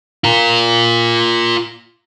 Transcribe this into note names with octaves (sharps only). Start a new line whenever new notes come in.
F4 A#4